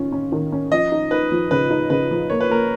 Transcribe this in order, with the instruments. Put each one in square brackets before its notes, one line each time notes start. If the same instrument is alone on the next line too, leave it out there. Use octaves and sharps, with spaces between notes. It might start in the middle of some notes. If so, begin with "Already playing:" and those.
Already playing: [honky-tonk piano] D#3 C#4 F4
C#4
D#3
C#4
[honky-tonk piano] F3 [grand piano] D#5
[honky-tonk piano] D#4
[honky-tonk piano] D#4 [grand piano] B4
[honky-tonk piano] F3
[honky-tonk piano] C#3 [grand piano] B4
[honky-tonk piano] D#4
[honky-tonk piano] C#3 [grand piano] B4
[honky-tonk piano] F3
[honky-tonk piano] A#3 [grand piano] C#5
[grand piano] B4
[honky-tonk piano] A#3 [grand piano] A#4